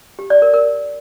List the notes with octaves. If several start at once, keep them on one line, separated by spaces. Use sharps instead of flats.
G4
D5
A#4
A#4